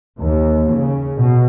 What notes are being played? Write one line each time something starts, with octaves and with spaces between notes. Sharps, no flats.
D#2
C#3
B2